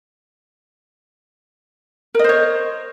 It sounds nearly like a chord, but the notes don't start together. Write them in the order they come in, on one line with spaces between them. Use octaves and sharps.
A#4 D#5 C5 C#5